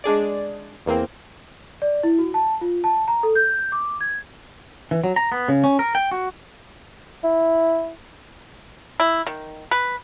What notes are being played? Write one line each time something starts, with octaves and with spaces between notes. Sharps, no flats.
G#3 D4 G#4 D5
E2 A#3 C4
D5
E4
F#4
A5
F4
A5
A#5
A4
G6
D6
G#6
E3
F#3
A#5
B3
C#3
C#4
A#4
G5
F#4
E4
E4
D#3
B4